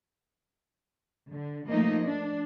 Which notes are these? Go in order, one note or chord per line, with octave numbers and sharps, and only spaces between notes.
D3
F3 A3 A#3 D#4 D#5
D4